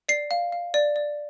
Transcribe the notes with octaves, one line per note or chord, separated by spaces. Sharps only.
D5 C7
F5
F5
D5
D5